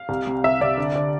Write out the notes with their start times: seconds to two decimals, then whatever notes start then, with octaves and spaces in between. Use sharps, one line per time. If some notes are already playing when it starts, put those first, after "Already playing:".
Already playing: F5
0.09 C2
0.27 C3
0.44 C2 E5
0.61 C2 D5
0.78 D3
0.95 D3